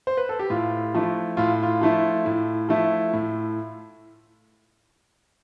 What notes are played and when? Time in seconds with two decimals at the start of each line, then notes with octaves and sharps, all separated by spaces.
0.07 C5
0.17 B4
0.29 A4
0.39 G4
0.50 A2 F4
0.94 F3 A3 E4
1.37 A2 F4
1.63 F4
1.81 F3 A3 E4
2.26 A2
2.69 F3 A3 E4
3.13 A2